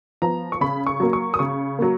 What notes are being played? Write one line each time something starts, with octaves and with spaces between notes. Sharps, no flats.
F3 B3 A#5
C#6
C#3 B5
C#6
F#3 A#3
C#6
D#6
C#3 C#6
F#3 A#3